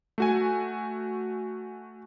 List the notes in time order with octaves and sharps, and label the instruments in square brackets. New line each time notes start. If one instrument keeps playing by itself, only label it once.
[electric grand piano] A3 F#4 G#5